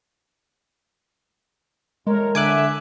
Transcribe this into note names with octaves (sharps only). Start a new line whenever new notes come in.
E2 A2 G#3 A#4 C#5
D3 E5 G#5 D6 F#6